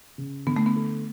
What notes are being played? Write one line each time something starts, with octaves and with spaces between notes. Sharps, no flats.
C#3
D3 B3
A3
B3
A3